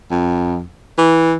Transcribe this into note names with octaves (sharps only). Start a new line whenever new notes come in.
F2
E3